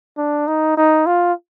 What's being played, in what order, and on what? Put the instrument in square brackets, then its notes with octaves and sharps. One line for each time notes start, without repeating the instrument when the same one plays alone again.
[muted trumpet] D4
D#4
D#4
F4